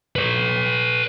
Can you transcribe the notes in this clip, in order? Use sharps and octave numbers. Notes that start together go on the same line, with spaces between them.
B4 C#5